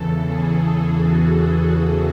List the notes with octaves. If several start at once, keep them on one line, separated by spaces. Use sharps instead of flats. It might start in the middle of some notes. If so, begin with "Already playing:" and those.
Already playing: E2 C#3 E3 A4
G#4
F#4
G#4